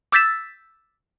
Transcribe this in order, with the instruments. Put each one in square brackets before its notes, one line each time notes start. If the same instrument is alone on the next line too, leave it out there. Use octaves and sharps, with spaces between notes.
[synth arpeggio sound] D6 E6 G6 A6 B6 E7